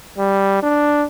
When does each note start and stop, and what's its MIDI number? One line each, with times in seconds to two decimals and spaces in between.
0.18 0.63 55
0.63 1.05 62